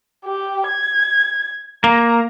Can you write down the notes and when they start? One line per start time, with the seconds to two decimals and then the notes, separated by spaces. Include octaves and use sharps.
0.25 G4
0.68 G#6
1.84 A#3 A#5